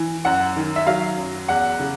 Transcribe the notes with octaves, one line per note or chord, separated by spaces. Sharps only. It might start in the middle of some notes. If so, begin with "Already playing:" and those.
Already playing: E3
F#2 F#5
D#3
E5
F#3 F5
F#2
E2 F#5
C#3